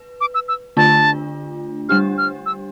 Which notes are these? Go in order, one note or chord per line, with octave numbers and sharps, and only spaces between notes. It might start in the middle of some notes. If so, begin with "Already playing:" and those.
Already playing: B4
D6
E6
E6
D3 A3 D4 F4 A5
G3 D4 G4 F6
F6
E6